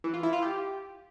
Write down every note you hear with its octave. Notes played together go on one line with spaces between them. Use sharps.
E3
F4
E4
F4
G4